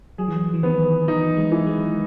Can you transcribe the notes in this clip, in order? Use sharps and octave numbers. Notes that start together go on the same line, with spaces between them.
F#3 G#4
E3
F#3
E3
D#3 B3
E3 D#4
G#3
E3
G#3